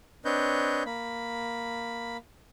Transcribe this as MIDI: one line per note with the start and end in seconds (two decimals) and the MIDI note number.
0.25 0.83 60
0.25 0.83 62
0.25 0.83 71
0.25 0.83 73
0.25 0.83 75
0.25 0.83 91
0.86 2.17 58
0.86 2.17 83